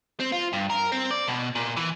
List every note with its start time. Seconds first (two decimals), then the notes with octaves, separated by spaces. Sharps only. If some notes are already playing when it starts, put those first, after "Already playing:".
0.20 C4
0.32 F4
0.53 G2
0.70 A#4
0.92 C4
1.11 D5
1.28 B2
1.56 A#2
1.77 E3